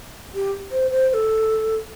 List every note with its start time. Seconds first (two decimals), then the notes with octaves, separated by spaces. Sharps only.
0.35 G4
0.72 C5
0.91 C5
1.09 C5
1.14 A4